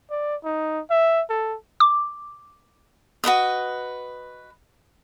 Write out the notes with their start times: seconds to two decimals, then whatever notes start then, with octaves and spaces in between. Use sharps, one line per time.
0.11 D5
0.44 D#4
0.90 E5
1.30 A4
1.80 D6
3.24 F#4 B4 D#5 D#6